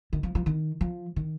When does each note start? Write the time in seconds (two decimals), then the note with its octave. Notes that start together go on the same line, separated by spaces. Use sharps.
0.13 D#3
0.23 F3
0.35 F3
0.46 D#3
0.81 F3
1.16 D#3